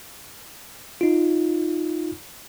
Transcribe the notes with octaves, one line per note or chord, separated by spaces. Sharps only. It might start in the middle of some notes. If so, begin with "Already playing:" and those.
D#4 F4